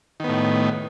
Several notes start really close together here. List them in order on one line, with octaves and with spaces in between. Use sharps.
D#3 B3 A2